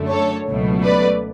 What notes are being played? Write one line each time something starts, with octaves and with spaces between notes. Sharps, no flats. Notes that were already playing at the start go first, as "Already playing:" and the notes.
Already playing: F#2 D3 A3
A4 C#5
C#2 B2 F#3 A3
B4 D5